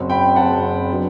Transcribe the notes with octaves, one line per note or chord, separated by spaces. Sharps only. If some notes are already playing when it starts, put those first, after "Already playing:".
Already playing: F#1 F#2 F#3 C4
G5 B5
F#1 F#2 F#3 C4 F#5 A5
F#3 B3 D4